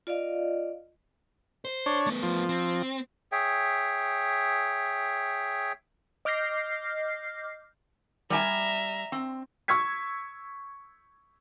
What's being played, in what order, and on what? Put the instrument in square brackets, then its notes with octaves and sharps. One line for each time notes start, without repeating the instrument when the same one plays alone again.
[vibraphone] F4 D5 D#5 F5
[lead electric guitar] C5
[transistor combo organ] D4 C#5
[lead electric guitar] A3 B3
[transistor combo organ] F3
[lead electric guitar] C4
[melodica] G#4 C#5 E5 G5
[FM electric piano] D#5 D6 F6 G6 A#6 C7
[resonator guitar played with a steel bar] G3 G5 G#5 [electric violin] E5 A#5
[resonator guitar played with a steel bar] C4
[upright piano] C#6 E6 G#6 B6